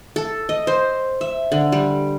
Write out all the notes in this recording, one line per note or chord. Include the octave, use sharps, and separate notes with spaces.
A4
D#5
C5
E5
D3
G3